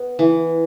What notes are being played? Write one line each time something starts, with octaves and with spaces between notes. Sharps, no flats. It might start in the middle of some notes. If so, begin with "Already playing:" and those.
Already playing: B3
E3